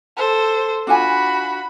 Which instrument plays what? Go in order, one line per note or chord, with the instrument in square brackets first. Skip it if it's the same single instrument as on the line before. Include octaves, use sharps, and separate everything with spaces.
[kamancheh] A4 C5
[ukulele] D4 F4 G#5 [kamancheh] F#4 B5